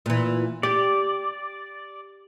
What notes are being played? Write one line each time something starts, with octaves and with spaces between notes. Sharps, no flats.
A#2 E3
G4 D5